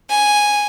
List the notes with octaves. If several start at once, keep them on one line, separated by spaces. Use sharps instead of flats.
G#5